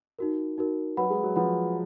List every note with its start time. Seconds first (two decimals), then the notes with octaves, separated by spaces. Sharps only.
0.19 D#4 F#4 A#4
0.58 D#4 F#4 A#4
0.97 F#3 B4 F#5 B5
1.10 G#3
1.23 F#3
1.36 F3 B4 F#5 B5